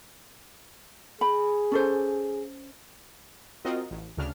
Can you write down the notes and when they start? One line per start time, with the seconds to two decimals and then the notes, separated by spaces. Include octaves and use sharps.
1.21 G#4 B5
1.72 C#4 A4 C5
3.65 C4 F4 F#4 A#4 D#5
3.91 A1
4.17 D2 C#3 D4 F6